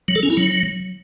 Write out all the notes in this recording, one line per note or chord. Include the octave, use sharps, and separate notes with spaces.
F#3
A4
C#4
E4
F#3